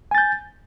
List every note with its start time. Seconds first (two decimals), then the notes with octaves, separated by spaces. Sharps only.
0.11 G#5
0.15 A6
0.18 G6